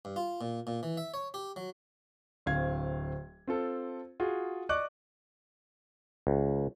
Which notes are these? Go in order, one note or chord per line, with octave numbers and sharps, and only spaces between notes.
G2
F4
A#2
A#2
E3
E5
C#5
G4
F#3
D1 C4 F5 G#6
C4 F4 A4
F4 F#4 G#4
D5 D#5 C#6 D6 F#6
C#2